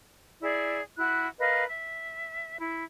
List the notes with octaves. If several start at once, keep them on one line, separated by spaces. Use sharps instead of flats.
E4 G#4 D5
E4 F#4 B5 F#6
A#4 B4 D#5 F5
E5
E4